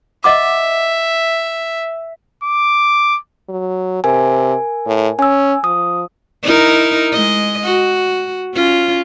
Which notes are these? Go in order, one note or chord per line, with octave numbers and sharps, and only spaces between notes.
D#5 E5 F#5 D6
D6
F#3
C3 A#4 G#5
A2
C#4 G#5 E6
F3 D#6
D#4 E4 A#4
G#3 D#5
F#4
C#4 F4